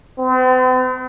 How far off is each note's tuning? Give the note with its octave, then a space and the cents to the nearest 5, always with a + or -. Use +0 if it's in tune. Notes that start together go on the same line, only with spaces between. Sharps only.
C4 -45